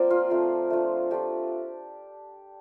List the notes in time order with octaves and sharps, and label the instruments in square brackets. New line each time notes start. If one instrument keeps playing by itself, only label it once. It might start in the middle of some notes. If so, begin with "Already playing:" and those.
Already playing: [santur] F3 A#3 C4 C5 D5
F4
F3 A3 C4
A3 D4 F4
A3 D4 F4 G4